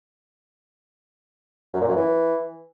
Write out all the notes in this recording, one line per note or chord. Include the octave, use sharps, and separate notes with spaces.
F#2
A#2
F#2
E3